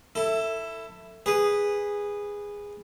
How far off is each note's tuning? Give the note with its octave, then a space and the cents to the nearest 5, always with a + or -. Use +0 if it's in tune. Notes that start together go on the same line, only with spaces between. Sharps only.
E4 +0 A4 +20
G#4 -15 B4 +0